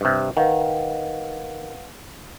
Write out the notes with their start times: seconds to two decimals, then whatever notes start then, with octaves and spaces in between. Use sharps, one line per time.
0.01 G2 C3
0.37 D#3 B4 F5 F#5